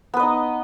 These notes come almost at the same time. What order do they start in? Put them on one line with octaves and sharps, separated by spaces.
B3 B4 D#5 D#4